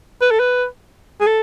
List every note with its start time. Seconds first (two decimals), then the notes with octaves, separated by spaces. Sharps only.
0.21 B4
0.31 A4
0.39 B4
1.21 G#4
1.27 A4